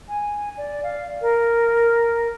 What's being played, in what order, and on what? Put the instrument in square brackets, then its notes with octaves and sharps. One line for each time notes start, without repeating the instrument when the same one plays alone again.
[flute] G#5
D5
F5
A#4